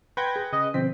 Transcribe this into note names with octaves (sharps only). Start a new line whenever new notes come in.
B4 F#5 G5 B5 C6 G6 G#6 A#6
G#4
C#3 D#5
B2 D3 F3 C4 B6